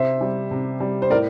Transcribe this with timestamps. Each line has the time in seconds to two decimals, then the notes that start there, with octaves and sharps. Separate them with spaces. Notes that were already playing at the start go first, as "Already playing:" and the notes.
Already playing: C3 C5 E5
0.21 G3
0.51 C3
0.80 G3
1.02 C5
1.10 A2 A#4 D5